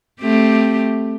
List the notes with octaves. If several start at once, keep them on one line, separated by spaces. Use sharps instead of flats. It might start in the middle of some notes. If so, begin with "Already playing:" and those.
A3 C4 G4